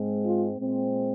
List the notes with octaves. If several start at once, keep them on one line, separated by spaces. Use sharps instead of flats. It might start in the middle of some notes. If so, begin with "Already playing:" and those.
Already playing: G#2 G#3 C4
F4
A#2 G#3 C4